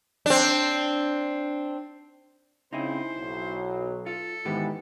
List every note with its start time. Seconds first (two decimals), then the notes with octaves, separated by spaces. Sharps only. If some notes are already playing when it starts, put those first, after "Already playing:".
0.26 C4 D4
2.73 C#3 C4 D#4 E4 G#4 C5
3.17 B1 F#3
4.06 F4 A4
4.45 G#2 D#3 E3 G#3 B3 G4